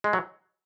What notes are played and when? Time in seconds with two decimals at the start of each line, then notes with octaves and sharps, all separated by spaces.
0.04 G#3
0.13 F#3